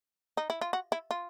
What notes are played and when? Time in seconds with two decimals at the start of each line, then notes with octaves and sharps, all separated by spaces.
0.37 D#4
0.50 E4
0.61 F4
0.73 F#4
0.92 E4
1.11 F4